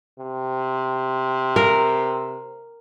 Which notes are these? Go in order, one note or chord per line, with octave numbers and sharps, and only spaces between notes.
C3
A#4